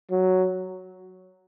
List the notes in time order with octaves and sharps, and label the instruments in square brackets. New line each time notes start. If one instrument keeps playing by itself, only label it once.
[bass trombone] F#3